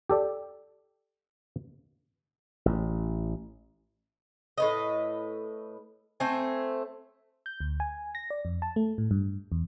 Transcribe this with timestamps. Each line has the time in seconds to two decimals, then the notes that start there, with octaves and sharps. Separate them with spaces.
0.09 G4 A4 D5
2.66 A1
4.58 A2 B4 D#5
6.20 A3 C4 C5 G#5
7.46 G6
7.60 D2
7.80 G#5
8.15 A#6
8.30 D5
8.45 F2
8.62 A5
8.76 A3
8.98 A2
9.11 G2
9.52 E2